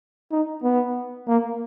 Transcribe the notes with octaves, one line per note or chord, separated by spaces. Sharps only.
D#4
B3
A#3